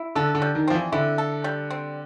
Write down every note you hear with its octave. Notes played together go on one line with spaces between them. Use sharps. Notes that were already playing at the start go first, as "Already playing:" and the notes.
Already playing: E4
D3 A4
D3
G3
D#3
F3 C4
E3
D3 E4
A4
G3
C4